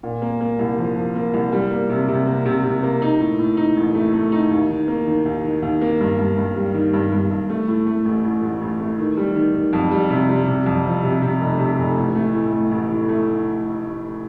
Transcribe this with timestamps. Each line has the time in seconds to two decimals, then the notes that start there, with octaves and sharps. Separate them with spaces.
0.03 A#2
0.22 A#3
0.41 A#3
0.59 C2
0.78 F3
0.96 F3
1.15 A#3
1.34 C2
1.52 G3
1.71 A#3
1.89 C3
2.08 C3
2.27 A#3
2.45 C3
2.64 C3
2.83 A#3
3.02 D#4
3.20 A2
3.39 A2
3.57 D#4
3.76 A1
3.95 A3
4.14 A3
4.32 D#4
4.51 D#2
4.70 D#3
4.88 A#3
5.07 D#3
5.25 D#2
5.44 D#3
5.62 D#2
5.81 A#3
6.00 G2
6.19 G2
6.37 G2
6.56 G3
6.74 D#3
6.93 G2
7.12 G2
7.31 G2
7.49 A3
7.68 A2
7.86 A3
8.05 A1
8.24 A1
8.42 A1
8.61 A1
8.80 A3
8.98 D#3
9.17 G3
9.36 D#3
9.54 D#3
9.73 F2
9.92 G3
10.10 C3
10.29 G3
10.48 C3
10.66 F2
10.85 F3
11.04 C3
11.22 C3
11.41 F1
11.60 C3
11.78 F1
11.97 A1
12.15 A3
12.34 A2
12.52 A3
12.71 A1
12.90 A2
13.09 A3